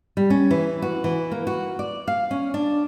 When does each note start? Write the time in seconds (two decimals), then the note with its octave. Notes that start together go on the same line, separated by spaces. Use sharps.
0.17 G3
0.30 C#4
0.51 E3
0.82 F#4
1.04 E3
1.31 A#3
1.47 F#4
1.79 D5
2.08 F5
2.31 C#4
2.54 D4